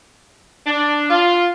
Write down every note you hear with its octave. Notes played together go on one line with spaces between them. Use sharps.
D4
F4